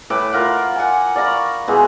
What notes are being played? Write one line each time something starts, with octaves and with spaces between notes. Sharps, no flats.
A2 B4 E5 D6
F4 A#4 F5 F#5
F#5 G#5
D5 F5 A#5 B5
C#6
B2 E3 G#3